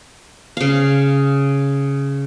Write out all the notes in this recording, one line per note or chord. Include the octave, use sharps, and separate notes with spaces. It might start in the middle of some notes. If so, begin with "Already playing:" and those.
C#3 F5